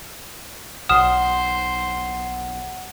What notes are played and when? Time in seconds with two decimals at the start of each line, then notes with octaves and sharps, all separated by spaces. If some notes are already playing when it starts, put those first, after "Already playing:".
0.89 B1 C5 F#5 D#6 F6 E7